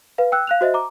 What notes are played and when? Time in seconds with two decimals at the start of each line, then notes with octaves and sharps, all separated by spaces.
0.18 B4 F5
0.32 G5 E6 F#6
0.47 F5 F#6 F7
0.61 F#4 C5 D#5 E5
0.74 A#5 D6